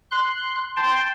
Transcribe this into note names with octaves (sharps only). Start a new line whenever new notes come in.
C6 F#6
G5 A5 C6